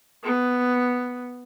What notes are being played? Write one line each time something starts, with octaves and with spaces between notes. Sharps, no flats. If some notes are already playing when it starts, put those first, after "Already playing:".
B3